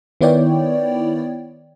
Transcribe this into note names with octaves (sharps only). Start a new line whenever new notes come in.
D#3 B3 E4 C#5 D5 G5